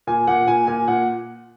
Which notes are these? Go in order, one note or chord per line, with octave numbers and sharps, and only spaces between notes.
A#2 G#5
A#2 F#5
A#2 G#5
A#2 G#5
A#2 F#5